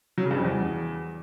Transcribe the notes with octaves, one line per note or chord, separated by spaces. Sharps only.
F#3
C#3
G2
F2
E2